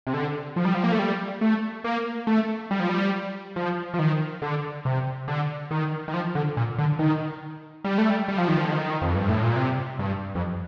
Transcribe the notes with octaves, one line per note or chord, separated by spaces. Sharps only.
C3
D3
F3
G3
F3
A#3
A3
G3
A3
A#3
A3
G3
F3
G3
F3
F3
D#3
D3
C3
D3
D#3
D#3
F3
D3
A#2
D3
D#3
G3
A3
G3
G3
F3
D#3
F3
D3
D#3
F2
G2
A2
A#2
C3
G2
F2